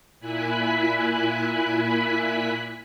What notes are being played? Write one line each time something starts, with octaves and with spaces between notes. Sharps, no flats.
A#2 E4 G#5 B5 F#6 B6